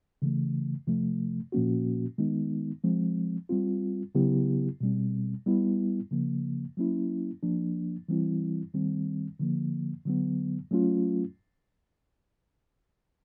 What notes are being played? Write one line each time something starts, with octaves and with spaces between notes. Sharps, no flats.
C#3 E3 A3
C3 F3 A3
A#2 F3 A#3 C#4 F#4
D#3 G#3 B3 D#4
F3 G#3 C4
G3 C4 F4
C#3 F#3 B3 E4 G4
B2 G3 C4
G3 B3 E4
C#3 F3 A#3
F#3 A#3 C#4 E4
F3 A#3 D4
E3 G3 C4 E4
D#3 G3 C4
D3 F3 A#3
D3 F#3 B3
F#3 A3 C#4 F4